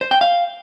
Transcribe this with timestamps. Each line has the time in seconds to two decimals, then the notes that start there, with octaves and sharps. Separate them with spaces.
0.01 C5
0.11 G5
0.21 F5